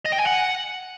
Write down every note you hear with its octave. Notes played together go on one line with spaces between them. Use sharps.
D#5
G5
G#5
F#5